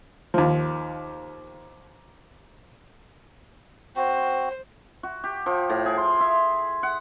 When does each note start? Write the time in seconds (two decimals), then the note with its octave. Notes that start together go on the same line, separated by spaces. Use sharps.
0.34 D#2 F3
3.96 C4 F#4 C5
5.03 F#4
5.24 G4
5.46 F3
5.70 A2
5.86 G#4
5.98 C6
6.20 E5
6.83 F#5